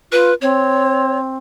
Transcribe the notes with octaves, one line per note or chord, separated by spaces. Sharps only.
F4 B4
C4 C#5